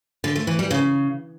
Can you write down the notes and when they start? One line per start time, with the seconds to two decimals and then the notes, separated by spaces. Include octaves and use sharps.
0.24 D3
0.36 A3
0.47 E3
0.59 G3
0.71 C#3